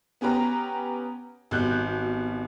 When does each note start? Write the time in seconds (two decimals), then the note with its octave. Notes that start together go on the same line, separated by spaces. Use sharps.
0.21 B3 C#4 G4 B4 A#5
1.51 G#1 B2 G3 F#6 G6